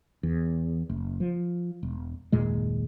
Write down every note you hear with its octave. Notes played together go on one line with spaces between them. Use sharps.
E2
F#1
F3
E1
F#1 D#2 A#2 G#3